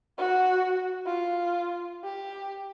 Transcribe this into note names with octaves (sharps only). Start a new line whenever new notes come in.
F#4
F4
G4